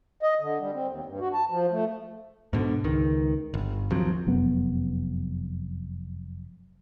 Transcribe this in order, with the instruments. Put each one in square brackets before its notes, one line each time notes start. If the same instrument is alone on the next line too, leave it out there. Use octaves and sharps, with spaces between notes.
[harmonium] D#5
D3
G3
C4
D#2
G2
F#4
A5
F3
A3
[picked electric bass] G#2 B2 D3
C#2 D#3
G1
D#2 F3 F#3 C4
[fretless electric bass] F1 F#2 B3